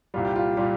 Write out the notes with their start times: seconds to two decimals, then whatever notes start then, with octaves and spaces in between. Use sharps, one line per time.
0.14 C2 A#2 G3 F4
0.25 G4
0.36 F4
0.57 A#2 G3 F4